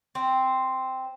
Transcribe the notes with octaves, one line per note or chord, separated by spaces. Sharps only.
C4